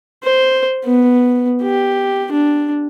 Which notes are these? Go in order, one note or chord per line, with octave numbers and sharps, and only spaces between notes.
C5
B3
G4
D4